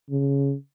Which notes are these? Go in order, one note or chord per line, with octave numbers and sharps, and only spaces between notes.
C#3